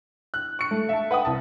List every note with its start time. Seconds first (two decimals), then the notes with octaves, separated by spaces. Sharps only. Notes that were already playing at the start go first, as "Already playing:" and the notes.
0.34 F#6
0.59 C#6 C#7
0.71 A3
0.89 E5 A5
1.11 B4 F#5 G5 D#6
1.25 C2 A5